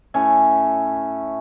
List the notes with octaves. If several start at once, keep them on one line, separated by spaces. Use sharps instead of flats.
A2 A3 C#4